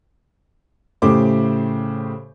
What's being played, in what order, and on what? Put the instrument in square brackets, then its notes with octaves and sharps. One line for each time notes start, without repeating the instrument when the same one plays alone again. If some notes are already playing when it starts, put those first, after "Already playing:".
[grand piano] A2 C#3 A3 G4 C5 D6